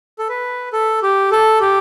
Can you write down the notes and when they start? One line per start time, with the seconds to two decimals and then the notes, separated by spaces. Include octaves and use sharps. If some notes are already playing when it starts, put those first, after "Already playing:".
0.19 A4
0.29 B4
0.73 A4
1.03 G4
1.32 A4
1.61 G4